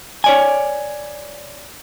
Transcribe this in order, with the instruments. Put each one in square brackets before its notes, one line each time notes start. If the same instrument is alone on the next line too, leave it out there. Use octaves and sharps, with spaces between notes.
[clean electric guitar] C#5 D5 G#5